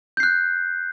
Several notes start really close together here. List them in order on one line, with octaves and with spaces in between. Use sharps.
G6 C7 F#6